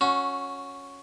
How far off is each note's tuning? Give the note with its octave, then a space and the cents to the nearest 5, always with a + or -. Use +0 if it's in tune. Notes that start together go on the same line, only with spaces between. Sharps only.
C#4 +0 F#4 -20